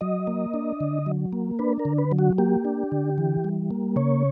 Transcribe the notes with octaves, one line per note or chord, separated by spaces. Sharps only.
F#3 D#5
A#3
D4
D3
F#3
A#3
D4 B4
A#4
D3
B4
F#3
F#4
A#3 G4
D4
D3
E3
G3
A#3
C#3 C#5